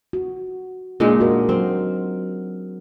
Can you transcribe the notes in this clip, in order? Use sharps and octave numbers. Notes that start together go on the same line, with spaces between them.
F#4
A#2 G#3 D4 D#4
F#4 A#4
F#3 C4